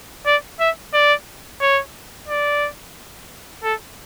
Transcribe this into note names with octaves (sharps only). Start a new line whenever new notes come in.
D5
E5
D5
C#5
D5
A4